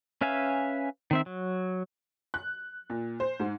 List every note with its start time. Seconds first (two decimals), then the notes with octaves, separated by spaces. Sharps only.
0.21 C#4 B4 E5 F5 G#5
1.11 D#3 C4 E5
1.26 F#3
2.34 F#6
2.90 A#2
3.20 C5
3.40 G#2